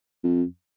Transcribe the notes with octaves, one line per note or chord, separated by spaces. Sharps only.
F2